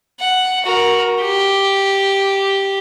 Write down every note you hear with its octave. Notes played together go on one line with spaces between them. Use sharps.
F#5
F#4 A#4
G4